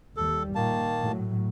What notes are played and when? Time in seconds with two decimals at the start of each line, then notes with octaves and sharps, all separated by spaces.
0.17 D#2 G3 A4
0.55 A#2 D#3 A#3 A5
1.01 A2 F#3